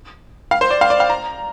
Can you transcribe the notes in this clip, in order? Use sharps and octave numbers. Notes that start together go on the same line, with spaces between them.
F5
C5
D5
F5
D5
F5
A#5